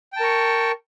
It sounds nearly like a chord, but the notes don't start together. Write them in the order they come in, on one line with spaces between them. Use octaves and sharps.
G5 A5 A#4 C#6